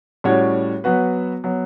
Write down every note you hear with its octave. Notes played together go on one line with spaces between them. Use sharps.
A2 G3 C#4 F#4 C#5
F#3 B3 F#4 B4
F#3 B3